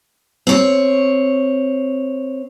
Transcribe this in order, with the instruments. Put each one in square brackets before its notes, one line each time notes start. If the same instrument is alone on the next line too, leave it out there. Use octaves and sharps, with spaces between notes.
[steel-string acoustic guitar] C4 C#5